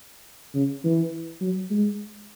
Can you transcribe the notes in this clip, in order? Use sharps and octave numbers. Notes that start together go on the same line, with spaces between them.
C#3
E3
F#3
G#3